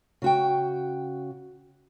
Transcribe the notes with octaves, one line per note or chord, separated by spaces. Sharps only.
C#3 F#4 G5